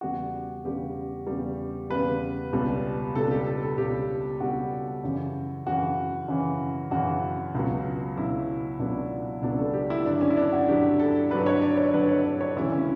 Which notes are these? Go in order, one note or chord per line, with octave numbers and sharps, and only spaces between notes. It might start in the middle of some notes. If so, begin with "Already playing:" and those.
E2 C#3 G3 F#4
E2 C#3 G3 G4
E2 C#3 G3
E2 C#3 G3 B4
C#2 B2 G3
C#2 B2 G3 A4
G4
A4
A4
C#2 B2 G3 G4
C#2 B2 G3 F#4
F#2 C#3 E3
F#2 C#3 E3 F#4
F#2 C#3 E3
F#2 C#3 E3 F#4
C#2 B2 F#3
C#2 B2 F#3 E4
C#2 B2 F#3 D4
C#2 B2 F#3 D4
A4
G4
E4
G2 D3 F#3 D4
C#4
E4
D4
F#4
G2 D3 F#3 G4
A4
G2 D3 F#3 B4
C#5
D5
C#5
G2 D3 F#3 B4
C#5
D5
C#5
D2 C#3 E3 G3 E4
C#4